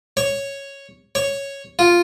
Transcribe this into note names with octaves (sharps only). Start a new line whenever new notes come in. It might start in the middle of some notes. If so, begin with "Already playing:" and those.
C#5
C#5
F4